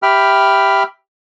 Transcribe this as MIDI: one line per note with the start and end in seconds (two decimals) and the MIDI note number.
0.03 0.83 67
0.03 0.83 76
0.03 0.83 79
0.03 0.83 83
0.03 0.83 89